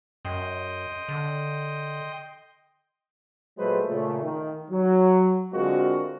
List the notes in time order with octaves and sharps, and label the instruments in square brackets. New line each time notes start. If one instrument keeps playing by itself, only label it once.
[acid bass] F#2 [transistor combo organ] D#5 G5 C6
[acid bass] D3
[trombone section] A#2 F#3 G#3 A3 B4 C5
A#2 C#3 A3
D#3
F#3
D3 G#3 C4 F4 F#4 A#4